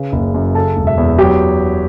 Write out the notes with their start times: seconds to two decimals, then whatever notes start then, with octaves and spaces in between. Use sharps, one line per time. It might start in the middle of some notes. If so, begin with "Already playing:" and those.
Already playing: C#3 B4
0.12 F#1
0.34 F#2
0.55 C#3 A4 A5
0.77 E1
0.87 E5
0.98 E2
1.18 F#3 G4 G5